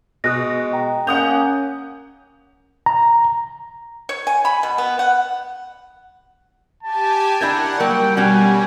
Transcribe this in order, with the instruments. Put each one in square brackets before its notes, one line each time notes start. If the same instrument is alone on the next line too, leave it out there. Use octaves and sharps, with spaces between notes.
[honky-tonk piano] B2 [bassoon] G#3 [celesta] D#6 F#6 A#6
[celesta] G5 A#5
[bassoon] A#3 [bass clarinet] C#4 [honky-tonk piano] F#5 D#6 G6 [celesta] F7
[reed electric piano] A#5
[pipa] C#5
G#5
B5
B2
B3
F#5
[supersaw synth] G4 G#5 [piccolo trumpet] A5
[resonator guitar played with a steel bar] D4 E4 A#4 [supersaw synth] F#5 [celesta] B5 G6 G#6
[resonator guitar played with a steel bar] F#3 A#3 [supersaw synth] G3 [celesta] A#4 [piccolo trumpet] G5
[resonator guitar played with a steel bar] B2 C#4 F#4 [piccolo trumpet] G#5